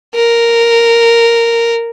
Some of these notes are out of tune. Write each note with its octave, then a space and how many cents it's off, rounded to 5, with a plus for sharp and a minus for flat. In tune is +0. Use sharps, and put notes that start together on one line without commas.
A#4 -5